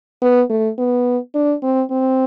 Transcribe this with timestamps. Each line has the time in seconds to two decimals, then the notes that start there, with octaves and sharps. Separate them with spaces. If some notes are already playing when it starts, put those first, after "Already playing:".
0.22 B3
0.50 A3
0.78 B3
1.35 D4
1.63 C4
1.91 C4